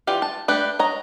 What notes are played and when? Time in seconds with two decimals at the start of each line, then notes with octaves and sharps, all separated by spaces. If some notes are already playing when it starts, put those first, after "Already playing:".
0.07 E3 F4 G4 D5
0.22 A5
0.48 A3 D4 G4 B4
0.79 C#5 D#5 A#5